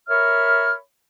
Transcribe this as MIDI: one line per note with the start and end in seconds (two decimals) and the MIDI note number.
0.09 0.73 70
0.09 0.73 73
0.09 0.73 76
0.09 0.73 83
0.09 0.73 89